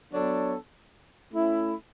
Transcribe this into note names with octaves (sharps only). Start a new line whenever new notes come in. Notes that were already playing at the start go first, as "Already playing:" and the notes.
F#3 B3 D4 A4 C#5
A3 C#4 E4